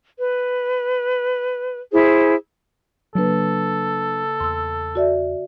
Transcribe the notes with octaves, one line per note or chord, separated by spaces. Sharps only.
B4
E4 G#4 C5
C#3 F#3 A#3 D4 A4 B4
E2 C6 E6
F#4 D5 E5